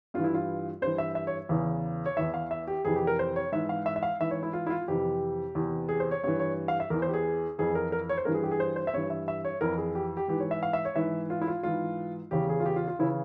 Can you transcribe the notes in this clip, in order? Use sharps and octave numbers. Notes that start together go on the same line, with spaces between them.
G2 E3 F4
E4
F4
G2 E3 C5
E5
E5
C#5
E2 C#3 E3
C#5
E2 E3 E5
F5
E5
G4
F2 C3 E3 G#4
G4
A#4
C5
C#5
G#2 E3 E5
F5
E5
E5
F5
G#2 E3 E5
C#5
E4
F4
E4
F4
F2 C3 E3 G4
E2 C3 E3
G#4
C5
C#5
G2 E3 C#5
C#5
F5
E5
E2 E3 A#4
C5
G4
G#4
F2 E3 G#4
A#4
A#4
C#5
C5
G2 E3 A#4
G#4
G4
G#4
C5
C5
E5
G2 E3 C#5
E5
E5
C#5
F2 E3 A#4
G#4
G4
G4
G#2 E3 G4
C#5
E5
F5
E5
C#5
G#2 E3 E5
F4
E4
F4
G#2 E3 F4
E2 C#3 E3 G4
G#4
F4
G4
F4
F4
C#3 E3 E4